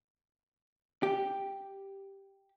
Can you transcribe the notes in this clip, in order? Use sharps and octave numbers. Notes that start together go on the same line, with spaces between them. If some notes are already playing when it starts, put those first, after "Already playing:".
G4